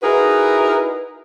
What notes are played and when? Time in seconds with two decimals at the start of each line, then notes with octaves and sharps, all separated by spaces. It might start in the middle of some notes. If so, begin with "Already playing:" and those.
0.03 D#4 E4 F#4 G#4 A#4 B4